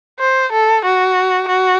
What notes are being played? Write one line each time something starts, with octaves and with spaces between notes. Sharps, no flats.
C5
A4
F#4
F#4